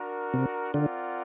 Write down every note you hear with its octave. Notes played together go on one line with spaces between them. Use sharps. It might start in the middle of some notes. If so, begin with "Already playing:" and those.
Already playing: D4 F#4 A#4
C3
D3 C4 F4 A#4 D5 F#5